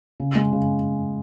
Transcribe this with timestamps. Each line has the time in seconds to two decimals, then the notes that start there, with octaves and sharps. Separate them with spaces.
0.20 C#3
0.35 G#3
0.52 C#3